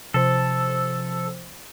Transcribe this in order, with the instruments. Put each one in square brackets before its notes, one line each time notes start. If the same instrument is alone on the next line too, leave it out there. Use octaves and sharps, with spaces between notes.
[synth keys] C3 F3 C5 [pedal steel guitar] A4